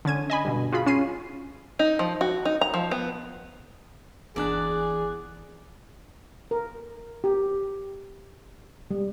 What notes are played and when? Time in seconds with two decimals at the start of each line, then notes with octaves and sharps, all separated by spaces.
0.05 D3 C#4 G#6 D#7
0.30 D#5 G#5 B5
0.45 G2 B2
0.72 F4 F#4 G#4 B5
0.86 C#4 F4 C7 D#7
1.79 D#4
1.99 F3
2.21 F#4
2.45 D#4
2.61 A#5
2.74 F3
2.91 B3
4.36 G1 E2 D4 G#4 D5 F#6
6.51 A#4
7.24 G4
8.91 G3